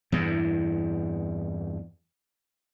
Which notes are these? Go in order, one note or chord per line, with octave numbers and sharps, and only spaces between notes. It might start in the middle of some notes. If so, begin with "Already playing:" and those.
E2 G2 E3